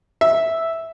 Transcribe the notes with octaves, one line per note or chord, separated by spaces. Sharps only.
E5